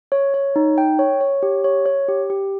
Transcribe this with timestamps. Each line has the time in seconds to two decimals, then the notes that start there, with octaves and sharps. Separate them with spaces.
0.12 C#5
0.34 C#5
0.56 D#4
0.78 G5
0.99 C#5
1.21 C#5
1.43 G4
1.64 C#5
1.86 C#5
2.09 G4
2.30 G4